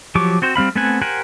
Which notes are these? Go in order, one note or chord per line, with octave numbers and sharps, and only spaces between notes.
F3 F#3 G4 C#6 D6
C4 F#4 C5
G3 C4 F5 B5
A3 B3 C4 F#5 G#5
G4 A#4 C5 F#5 G#5